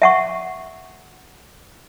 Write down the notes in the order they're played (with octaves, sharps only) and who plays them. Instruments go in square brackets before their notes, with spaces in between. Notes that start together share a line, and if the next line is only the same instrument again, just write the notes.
[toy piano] E5 F#5 C#6